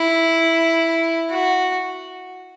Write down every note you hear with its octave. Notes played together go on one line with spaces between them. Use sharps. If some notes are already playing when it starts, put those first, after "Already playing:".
Already playing: E4
F#4